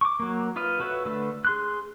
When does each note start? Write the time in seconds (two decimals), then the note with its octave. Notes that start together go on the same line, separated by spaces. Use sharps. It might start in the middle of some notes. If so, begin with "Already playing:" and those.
0.01 C#6 D6
0.20 F#3 A#3
0.56 F4 B4 D#5 F5
0.80 F#4 A4 B4 C#5 E5
1.05 D3 A3 A4 B4
1.45 G#4 C6 F#6